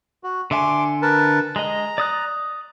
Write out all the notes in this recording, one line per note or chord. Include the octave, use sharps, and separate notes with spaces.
F#4
D3 E5 G#5 C6 D6
A#4 B4 A5
G#3 D#5 A#5
D5 D#6 F#6